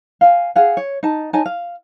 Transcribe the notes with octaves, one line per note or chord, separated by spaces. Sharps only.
F5 G#5
G#4 F5 F#5
C#5
D#4 A5
D#4 C#5 G#5 A5
F5